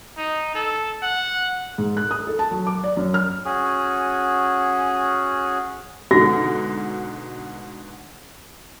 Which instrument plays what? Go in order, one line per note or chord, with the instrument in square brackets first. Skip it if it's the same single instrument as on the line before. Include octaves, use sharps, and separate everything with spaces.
[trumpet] D#4
A4
F#5
[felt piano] G#2
F#6
D#6
A4
A5
F#3
D6
D5
F#2
F6
[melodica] C#4 F#4 G#4
[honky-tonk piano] G#2 B2 D3 [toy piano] F#4 [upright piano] A#6